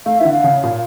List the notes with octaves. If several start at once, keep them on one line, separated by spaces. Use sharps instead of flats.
A3 F5
E3 E5
D3
F5
C#3
A#2